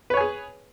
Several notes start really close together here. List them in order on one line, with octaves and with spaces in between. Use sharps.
B4 C#5 G#5 G#4